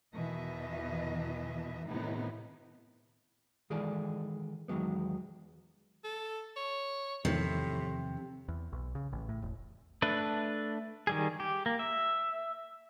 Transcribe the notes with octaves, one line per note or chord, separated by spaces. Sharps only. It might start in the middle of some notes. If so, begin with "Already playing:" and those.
E2 B2 D#3 E3 D#5 E5
A2 C3 D#3 B3 D#4 E4
D#3 E3 G#3 G#4 A4 D5
E2 D#3 F#3 G#3 B3
A4
C#5
E2 A2 C3 D#3 F3
E2
B1
C#3
A1
A2
E1
A3 D4 B4
D#3 G3 G#4
G4
A#3
E5